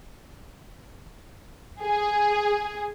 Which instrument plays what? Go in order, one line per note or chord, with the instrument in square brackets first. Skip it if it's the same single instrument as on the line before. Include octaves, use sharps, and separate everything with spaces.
[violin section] G#4